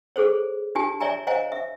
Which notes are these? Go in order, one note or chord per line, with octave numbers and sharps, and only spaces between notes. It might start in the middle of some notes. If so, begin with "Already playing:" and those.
G#4 A4 C5 C#5
D4 F4 G4 G#5 A5
C#5 D5 E5 G#5 A#5
C5 C#5 D#5 F5 G#5 A#5
E5